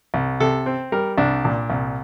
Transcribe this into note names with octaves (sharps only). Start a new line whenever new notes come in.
C2
C3 A4
C4
G3 A#4
C2 D4
A#2
C2